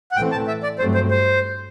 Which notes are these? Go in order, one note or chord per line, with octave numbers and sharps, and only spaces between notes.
F#5
A2 E3 A3 C4 G5
A5
E5
D5
G2 F#3 A3 C4 C5
C5
C5